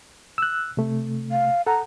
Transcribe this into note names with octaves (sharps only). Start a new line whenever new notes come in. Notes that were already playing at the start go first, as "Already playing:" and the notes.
E6 F#6
C3 A3
F5
A4 F#5 A#5